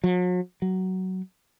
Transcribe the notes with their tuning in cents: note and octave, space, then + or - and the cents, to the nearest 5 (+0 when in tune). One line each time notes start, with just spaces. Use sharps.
F#3 -45
F#3 +15